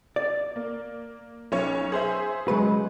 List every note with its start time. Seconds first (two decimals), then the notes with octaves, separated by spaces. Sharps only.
0.16 D5
0.56 A#3
1.52 B1 C#4 C#5
1.92 G#4 C5 E5
2.48 C#3 F#3 G#3 B4